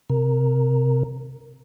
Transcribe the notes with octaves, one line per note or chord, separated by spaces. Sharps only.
C3 A#4